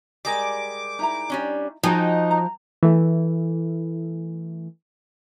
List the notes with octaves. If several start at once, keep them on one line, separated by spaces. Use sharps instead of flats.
G3 G#3 A#4 D6
D#4 E4 A#5
G3 C#4 D4
F3 D#4 F#4 G#4 D#5 G5
A#5
E3 A3